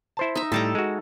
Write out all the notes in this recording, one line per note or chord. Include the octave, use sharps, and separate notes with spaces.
E4 C5 A5
D#4 E5
A2 G3 A4 A5 A#5
G#3 F#4